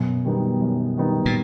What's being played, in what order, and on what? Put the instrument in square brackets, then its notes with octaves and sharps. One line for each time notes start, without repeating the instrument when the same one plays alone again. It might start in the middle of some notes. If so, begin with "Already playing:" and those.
Already playing: [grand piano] F#2 [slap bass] B2
[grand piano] D#3 G3 B3 D#4
F#2
D#3 G3 B3 D#4
[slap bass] A#2